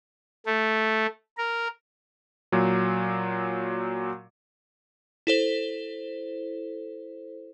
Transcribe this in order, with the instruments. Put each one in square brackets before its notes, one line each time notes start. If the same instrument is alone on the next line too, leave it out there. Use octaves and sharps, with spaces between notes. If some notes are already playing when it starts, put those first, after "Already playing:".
[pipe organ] A3
A#4
[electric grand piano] A#2 F#3
[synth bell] E4 A4 C5